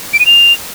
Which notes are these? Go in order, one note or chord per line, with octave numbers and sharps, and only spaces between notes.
D7
D#7
F7